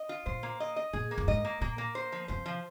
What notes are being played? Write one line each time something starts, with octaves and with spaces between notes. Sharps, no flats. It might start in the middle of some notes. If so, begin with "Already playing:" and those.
Already playing: D#5
F4
A#2 C5
A#3
D#5
D#5
A#2 G#4
A#3
F2
G#2 D#5
A#3
A#2 A#3
A#3
C5
F3
C3 C5
F3